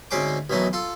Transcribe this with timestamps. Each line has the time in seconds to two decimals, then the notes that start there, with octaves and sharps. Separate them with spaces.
0.11 D2 G#2 C4 C#4 C5 D6
0.50 B1 D#3 E3 F#3 A3
0.73 F4 A4